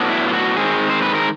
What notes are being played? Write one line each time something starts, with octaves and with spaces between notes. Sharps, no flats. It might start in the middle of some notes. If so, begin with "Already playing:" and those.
Already playing: A2 F#3 B3 D4
E4
F4
F#4
D#3 G#3 C4 G#4
C5
B4
A#4